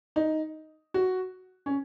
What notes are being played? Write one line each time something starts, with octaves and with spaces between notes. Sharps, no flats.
D#4
F#4
C#4